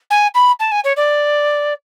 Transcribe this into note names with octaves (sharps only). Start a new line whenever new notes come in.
G#5
B5
A5
G#5
C#5
D5